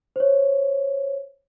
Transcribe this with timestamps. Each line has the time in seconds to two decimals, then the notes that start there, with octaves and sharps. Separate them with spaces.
0.16 C5 C#5